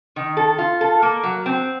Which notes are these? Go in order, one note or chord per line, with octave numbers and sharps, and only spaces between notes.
D#3
A4
F4
A4
A#3
F#3
C4